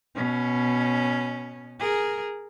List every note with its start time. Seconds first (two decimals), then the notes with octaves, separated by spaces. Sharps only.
0.15 B2 C#4
1.79 G#4 A#4